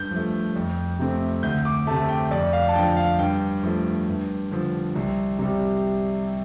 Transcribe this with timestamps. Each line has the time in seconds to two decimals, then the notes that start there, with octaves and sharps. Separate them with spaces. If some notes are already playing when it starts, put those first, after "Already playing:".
Already playing: G2 G6
0.11 F3 A3
0.56 F2
0.99 C3 A3 C4
1.43 D2 G6
1.65 D6
1.87 C3 A3 A5
2.09 G5
2.31 F2 D5
2.53 F5
2.68 A5
2.75 D3 F3 G5
2.97 F5
3.19 G2 G5
3.63 F3 A3
4.07 G2
4.52 D3 F3
4.95 C2
5.39 C3 G3